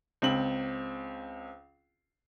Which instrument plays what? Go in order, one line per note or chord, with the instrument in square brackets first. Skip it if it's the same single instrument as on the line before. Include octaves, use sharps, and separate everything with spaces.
[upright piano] C#2 C4 F#7